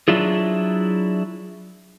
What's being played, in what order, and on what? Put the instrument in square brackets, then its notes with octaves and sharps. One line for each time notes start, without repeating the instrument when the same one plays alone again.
[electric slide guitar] F#3 D4 E4 F4 G#4